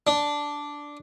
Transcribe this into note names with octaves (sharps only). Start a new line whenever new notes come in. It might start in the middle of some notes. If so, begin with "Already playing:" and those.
D4